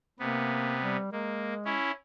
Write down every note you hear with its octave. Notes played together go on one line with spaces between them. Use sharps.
C3 A#3 B3
G3
G#3 A#3
C#4 E4